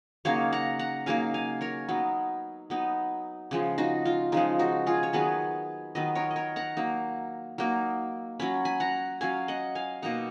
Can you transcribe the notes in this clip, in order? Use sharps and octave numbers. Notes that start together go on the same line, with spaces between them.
C#3 F#3 A#3 D#4 C#5 F5
F#5 A#5
F#5 A#5
C#3 F#3 A#3 D#4 F5 G#5
F5 G#5
A#4 C#5
F#3 B3 D#4
F#3 B3 D#4
C#3 F3 G#3
D#4 F#4
F4
C#3 F3 G#3 D#4
D#4 F#4
F4 G#4
C#5
D#3 F#3 B3 G#4 B4
D#3 F#3 B3 B4 D#5
A#4 C#5
D#5
A#4 C#5
F#5 A#5
F#3 A#3 D#4
F#3 A#3 D#4
F#3 C#4 B5
G#5 B5
F#5 A#5
F#3 C#4 F5 G#5
D#5 F#5
F5 G#5
B2 A#3 D#4 F#5 A#5